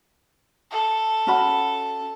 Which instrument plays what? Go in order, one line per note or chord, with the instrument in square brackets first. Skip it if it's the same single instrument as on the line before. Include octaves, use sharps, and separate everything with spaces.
[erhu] A4
[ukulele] C#4 F#4 B5